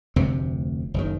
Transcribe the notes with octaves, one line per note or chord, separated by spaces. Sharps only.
F1 D2 C3 C4
F#1 D#3